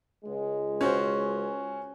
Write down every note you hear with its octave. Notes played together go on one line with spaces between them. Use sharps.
C#2 G#3
C#4 F#4 C5